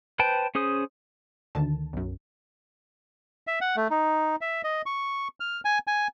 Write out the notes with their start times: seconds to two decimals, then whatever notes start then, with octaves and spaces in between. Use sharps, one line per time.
0.19 B4 C5 G5 A5
0.55 C#4 G#4 C5 D#6
1.55 D2 D3 D#3 A5
1.93 B1 F#2
3.47 E5
3.61 F#5
3.76 A3
3.90 D#4
4.41 E5
4.64 D#5
4.86 C#6
5.40 F6
5.65 G#5
5.87 G#5